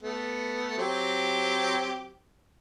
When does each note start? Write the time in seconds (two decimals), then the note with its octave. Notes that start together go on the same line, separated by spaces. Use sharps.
0.03 A3 B3
0.78 F#3 C4 G4